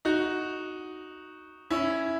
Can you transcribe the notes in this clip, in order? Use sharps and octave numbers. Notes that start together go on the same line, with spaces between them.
D#4 F#4
C#4 E4